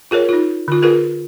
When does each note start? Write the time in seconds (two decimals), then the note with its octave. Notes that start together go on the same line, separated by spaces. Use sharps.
0.11 F4 G#4 A#4 C#5
0.29 D#4 F4
0.68 D3 F4
0.82 F4 G#4 A#4 B4